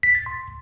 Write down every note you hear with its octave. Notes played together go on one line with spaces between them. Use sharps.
B6
A6
C6